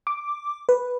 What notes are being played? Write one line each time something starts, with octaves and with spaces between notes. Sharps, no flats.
D6
B4